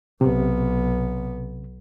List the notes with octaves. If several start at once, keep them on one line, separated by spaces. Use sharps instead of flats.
B1 C3 B3